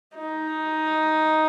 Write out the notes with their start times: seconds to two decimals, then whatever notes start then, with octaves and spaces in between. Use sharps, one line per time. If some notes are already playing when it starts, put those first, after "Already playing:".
0.16 D#4